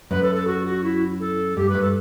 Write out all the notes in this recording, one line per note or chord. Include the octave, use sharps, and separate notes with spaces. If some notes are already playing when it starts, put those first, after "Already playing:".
F#2 B4
A4
A4
F#4
F#4
E4
A4
G2 G4
B4
G2
A4